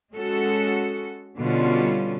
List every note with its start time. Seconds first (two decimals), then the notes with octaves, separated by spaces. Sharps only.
0.13 G#3 C#4 F#4 A4
1.38 B2 D3 G3 C#4 F4